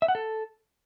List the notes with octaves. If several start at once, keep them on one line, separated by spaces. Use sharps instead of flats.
E5
F#5
A4